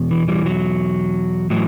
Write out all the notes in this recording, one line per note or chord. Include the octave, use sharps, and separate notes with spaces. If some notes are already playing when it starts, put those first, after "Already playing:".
Already playing: E2 B2
E3
E3 G3
F#3
A2 E3 F#3